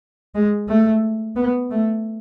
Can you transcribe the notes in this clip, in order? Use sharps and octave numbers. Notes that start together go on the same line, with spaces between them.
G#3
A3
B3
A3